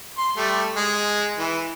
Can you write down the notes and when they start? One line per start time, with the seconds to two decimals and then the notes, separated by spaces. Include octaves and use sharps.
0.18 C6
0.37 G3 A3
0.77 G#3
1.39 E3